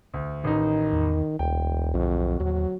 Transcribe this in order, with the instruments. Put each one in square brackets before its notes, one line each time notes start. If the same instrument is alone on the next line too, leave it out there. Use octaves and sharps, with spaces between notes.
[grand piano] D2
[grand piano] A1 D#4 [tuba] D#3
[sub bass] E2
[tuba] E1 [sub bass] D2 [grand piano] G5
[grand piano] D1 [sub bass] B1 [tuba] F2
[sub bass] D#2 [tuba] F#3